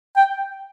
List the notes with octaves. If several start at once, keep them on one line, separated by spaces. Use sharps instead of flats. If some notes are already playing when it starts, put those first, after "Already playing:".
G5